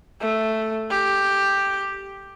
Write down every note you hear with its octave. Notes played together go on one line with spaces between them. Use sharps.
A3
G4